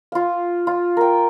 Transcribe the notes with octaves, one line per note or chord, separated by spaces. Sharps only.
F4 F5
F4
A#4 G5